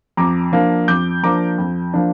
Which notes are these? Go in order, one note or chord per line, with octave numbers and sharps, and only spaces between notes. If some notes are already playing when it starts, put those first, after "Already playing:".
F2 A#5 D6
F3 A#3 D4
F2 D6 G6
F3 A#3 D4 A#5 D6
F2
F3 A#3 D4